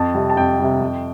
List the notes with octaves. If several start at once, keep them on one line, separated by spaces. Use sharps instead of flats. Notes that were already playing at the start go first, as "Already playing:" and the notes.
Already playing: F2 A5
C3 G3
A5
F2 G5
C3 G3
F2